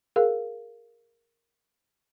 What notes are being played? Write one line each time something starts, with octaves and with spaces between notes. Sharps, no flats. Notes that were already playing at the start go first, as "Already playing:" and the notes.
G#4 A#4 F5